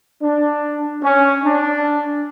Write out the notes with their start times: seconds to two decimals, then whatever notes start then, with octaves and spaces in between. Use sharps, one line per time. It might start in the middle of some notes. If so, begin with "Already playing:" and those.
0.22 D4
1.03 C#4
1.44 D4